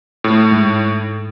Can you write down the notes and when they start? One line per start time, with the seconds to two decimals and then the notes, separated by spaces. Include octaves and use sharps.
0.24 A2
0.51 G#2